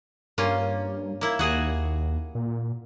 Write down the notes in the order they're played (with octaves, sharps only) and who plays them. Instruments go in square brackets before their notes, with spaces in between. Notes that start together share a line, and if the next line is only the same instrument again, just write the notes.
[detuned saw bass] G2 [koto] A#3 C#4 F4
[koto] A#3 E4
[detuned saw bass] D#2 [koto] F#4 G#4 F#5
[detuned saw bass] A#2